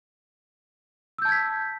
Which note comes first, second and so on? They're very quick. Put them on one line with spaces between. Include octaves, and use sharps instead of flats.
E6 G6 A5 G#6 B6